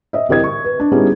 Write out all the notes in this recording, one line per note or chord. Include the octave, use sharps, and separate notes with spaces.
D#5 E5
C2 E3 G4 A#4 D#5 G#6
C#6
B4
D4
G3 B3 C#4 D#4 E4 G#4